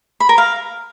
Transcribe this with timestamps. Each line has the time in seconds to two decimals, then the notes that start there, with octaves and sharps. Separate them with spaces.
0.20 B5
0.29 A#4
0.38 F5